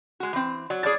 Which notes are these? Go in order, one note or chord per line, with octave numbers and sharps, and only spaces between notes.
G#3 F#4
E3 C4
F#3 D5
A2 G#4 D5 G#6 A6